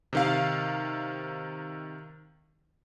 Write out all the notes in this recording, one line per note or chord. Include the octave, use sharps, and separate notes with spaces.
C3 D#3 F5